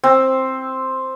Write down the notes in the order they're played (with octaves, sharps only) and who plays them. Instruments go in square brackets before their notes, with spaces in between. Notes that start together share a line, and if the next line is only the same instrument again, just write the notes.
[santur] C4